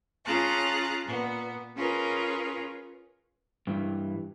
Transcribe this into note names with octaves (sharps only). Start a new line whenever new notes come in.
C#4 F4 G#4 A5 A#5 F#6
A#2 B3
C#4 F4 G#4 A#4 B4
G2 E3